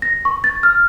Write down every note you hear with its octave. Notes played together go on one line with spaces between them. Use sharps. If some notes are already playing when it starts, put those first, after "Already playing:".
A#6
C#6
A6
F6